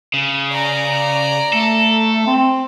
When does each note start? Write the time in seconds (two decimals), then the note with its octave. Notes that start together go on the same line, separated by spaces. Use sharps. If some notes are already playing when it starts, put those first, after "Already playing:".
0.14 C#3
0.52 D5 A#5
1.53 A3 A4
2.27 C4